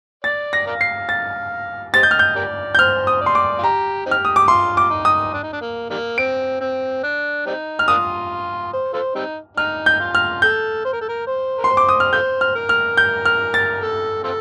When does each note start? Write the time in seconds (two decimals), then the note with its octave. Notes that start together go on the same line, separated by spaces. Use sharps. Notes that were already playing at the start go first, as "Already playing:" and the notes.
0.24 D5 A6
0.53 A#6
0.67 A#4 D5 F5
0.81 C7
1.09 A6
1.94 G4 C5 D#5 A6
2.03 G6
2.11 F6
2.19 G6
2.36 G4 A#4 D5
2.75 G6
2.79 C5 F6
3.07 D#6
3.21 D5 C6
3.35 D6
3.59 F4
3.64 G4 A#5
4.06 C4 D#4 G4
4.11 F6
4.25 D#6
4.36 D6
4.48 F4 C6
4.77 D6
4.90 D#4
5.05 D#6
5.33 D4
5.43 D#4
5.53 D4
5.62 A#3
5.90 D#3 G3 A#3
6.18 C4 D7
6.61 C4
7.03 D4
7.46 G3 C4 D#4
7.79 F6
7.88 A#3 D4 F4 D#6
8.73 C5
8.93 F4 A4 C5
9.15 G3 C4 D#4
9.57 D#4 F6
9.86 G6
10.00 F4
10.15 F6
10.42 A4 G6
10.85 C5
10.93 A#4
11.01 A4
11.09 A#4
11.27 C5
11.58 A#4
11.64 C6
11.69 C5
11.77 D6
11.89 D#6
12.00 F6
12.13 F4 A4 C5 G6
12.41 F6
12.55 A#4
12.69 F6
12.97 G6
13.25 F6
13.54 A6
13.82 A4
14.24 C4 F4 A4